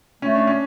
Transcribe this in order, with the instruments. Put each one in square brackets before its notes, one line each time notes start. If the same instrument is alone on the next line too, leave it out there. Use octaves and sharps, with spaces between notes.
[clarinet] A3 [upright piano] C#4
[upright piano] D4
C#4